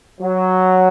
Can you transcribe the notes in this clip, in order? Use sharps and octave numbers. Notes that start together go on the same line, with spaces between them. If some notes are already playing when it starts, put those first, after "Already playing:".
F#3